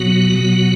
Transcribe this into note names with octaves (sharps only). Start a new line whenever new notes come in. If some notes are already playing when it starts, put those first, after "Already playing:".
Already playing: B2 F#3 B3 F#4
B2 F#3 B3 F#4